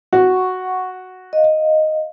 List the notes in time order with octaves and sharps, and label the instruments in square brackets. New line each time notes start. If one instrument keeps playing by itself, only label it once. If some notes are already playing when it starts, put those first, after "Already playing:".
[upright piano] F#4 [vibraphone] F#5 C#6
[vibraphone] D#5 F5